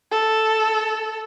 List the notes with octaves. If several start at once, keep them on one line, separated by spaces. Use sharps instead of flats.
A4